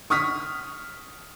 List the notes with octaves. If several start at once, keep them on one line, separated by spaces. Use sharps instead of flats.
C#6 D#6 F6 B6